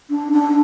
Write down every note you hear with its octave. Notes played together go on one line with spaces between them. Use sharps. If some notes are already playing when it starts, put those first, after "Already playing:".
D4
D4